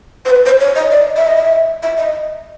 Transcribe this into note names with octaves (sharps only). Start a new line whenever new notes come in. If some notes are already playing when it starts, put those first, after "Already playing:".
C5
B4
C5
C#5
D#5
D5
E5
D#5
E5
E5
D#5